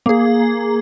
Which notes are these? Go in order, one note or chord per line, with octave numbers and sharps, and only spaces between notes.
A#3 G#4